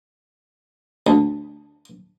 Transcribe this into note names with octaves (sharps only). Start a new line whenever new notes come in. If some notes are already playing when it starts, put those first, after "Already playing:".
D2